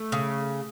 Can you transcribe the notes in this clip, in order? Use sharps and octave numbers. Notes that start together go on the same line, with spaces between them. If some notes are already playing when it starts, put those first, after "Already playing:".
Already playing: A3
C#3